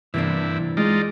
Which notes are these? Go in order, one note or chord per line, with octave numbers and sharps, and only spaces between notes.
G2 C3 E3 A#3 D4 E4
G#3 D#4 F4 D5